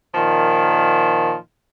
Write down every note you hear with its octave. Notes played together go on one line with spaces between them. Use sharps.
A#2 D#3 F3